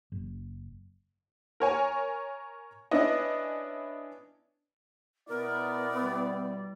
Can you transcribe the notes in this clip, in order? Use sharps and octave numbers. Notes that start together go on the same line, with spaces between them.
F#1
A#4 C#5 G#5
B3 C#4 D4 E4 D#5
B2 B3 E4 A#4 D5
G3